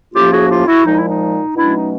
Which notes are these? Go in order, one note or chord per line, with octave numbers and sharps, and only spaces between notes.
A2 F3 A#3 C#4 F4 G4
F#4 G#4
F4 G4
E4 F#4
A#2 F3 G#3 D#4
E4
D#4
B2 F#3 A3 C#4 D4 E4
D#4